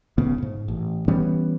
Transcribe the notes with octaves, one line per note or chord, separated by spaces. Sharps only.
D1 C#2 C#3 B3
G#2
A1
E3 G3 B3 C#4